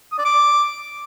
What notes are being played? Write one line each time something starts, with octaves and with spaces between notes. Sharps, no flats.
D#6
D5
D6